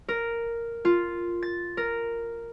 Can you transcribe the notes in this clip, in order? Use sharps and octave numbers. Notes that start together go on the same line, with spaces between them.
A#4
F4
A6
A#4